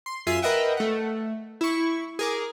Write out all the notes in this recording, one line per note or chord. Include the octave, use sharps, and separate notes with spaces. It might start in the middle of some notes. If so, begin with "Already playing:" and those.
C6
F#2 F4 G#4 E5 C7 D#7
A#4 B4 D#5 E5 F#5 G5
A3 F#5
E4 C#6
G#4 A#4 D6